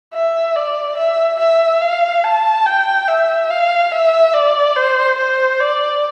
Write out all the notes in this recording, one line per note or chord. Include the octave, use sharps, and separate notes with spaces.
E5
D5
E5
E5
F5
A5
G5
E5
F5
E5
D5
C5
C5
D5